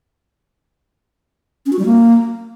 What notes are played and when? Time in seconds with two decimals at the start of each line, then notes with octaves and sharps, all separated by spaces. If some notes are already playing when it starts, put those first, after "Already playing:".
1.66 C#4
1.72 F#4
1.79 G3
1.86 A#3